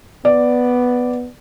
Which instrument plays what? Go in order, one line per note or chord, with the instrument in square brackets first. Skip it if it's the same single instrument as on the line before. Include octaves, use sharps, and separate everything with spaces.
[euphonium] B3 [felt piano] D5